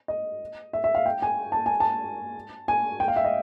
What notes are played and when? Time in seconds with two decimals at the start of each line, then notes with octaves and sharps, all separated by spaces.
0.08 D#5
0.73 E5
0.84 E5
0.95 F5
1.06 G5
1.22 G#5
1.52 A5
1.66 G#5
1.80 A5
2.68 G#5
3.00 G5
3.08 F5
3.16 E5
3.25 D#5